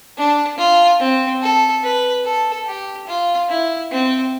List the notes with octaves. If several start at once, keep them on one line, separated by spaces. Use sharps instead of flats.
D4
F4
C4
A4
B4
A4
G4
F4
E4
C4